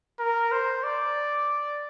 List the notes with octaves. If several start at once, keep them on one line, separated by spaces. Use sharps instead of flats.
A#4
C5
D5